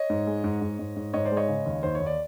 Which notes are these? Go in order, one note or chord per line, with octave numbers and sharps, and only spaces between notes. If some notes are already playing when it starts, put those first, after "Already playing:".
Already playing: C#5 D#5
G#2
G#3
G#2
G#2
G#2
G#2
G#2 C#5 D#5
C5 D5
G#3
C#5 D#5
C#3
D#2
D#2 C5
C#5
D#2
D5